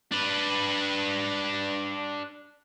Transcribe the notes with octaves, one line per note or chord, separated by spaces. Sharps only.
D4 B4